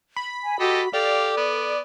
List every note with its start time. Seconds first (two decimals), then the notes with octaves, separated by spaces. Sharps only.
0.16 B5
0.44 G#5
0.60 F#4 G4 A4 D#5
0.93 G4 A4 D5 F5
1.37 B3